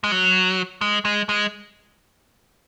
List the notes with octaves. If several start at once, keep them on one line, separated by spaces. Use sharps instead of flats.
G#3
F#3
G#3
G#3
G#3